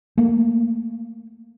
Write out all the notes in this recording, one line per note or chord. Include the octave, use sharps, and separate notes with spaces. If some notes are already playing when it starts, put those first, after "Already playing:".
A3 A#3